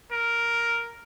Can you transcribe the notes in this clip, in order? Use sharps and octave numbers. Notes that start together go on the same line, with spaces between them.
A#4